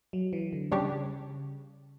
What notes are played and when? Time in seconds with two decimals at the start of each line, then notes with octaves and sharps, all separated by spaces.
0.13 F#3
0.33 E3
0.53 D3
0.72 C#3 G3 D4 G4 C#5